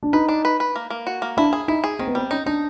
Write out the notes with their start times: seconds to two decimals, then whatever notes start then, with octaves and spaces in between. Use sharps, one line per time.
0.03 D4
0.13 D#4 B4
0.29 D4
0.45 B4
0.60 B4
0.76 A#3
0.90 A#3
1.07 F#4
1.22 A#3
1.37 D4 E4
1.53 G#4
1.68 D#4 E4
1.84 G#4
1.99 D#3 C4
2.07 B3
2.15 G3 C4
2.31 C#4 D#4
2.46 D4 D#4